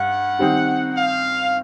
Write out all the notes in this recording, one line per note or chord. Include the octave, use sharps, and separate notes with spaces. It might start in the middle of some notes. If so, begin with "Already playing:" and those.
Already playing: G2 F#5
D#3 G3 C4 D#4 G4
F5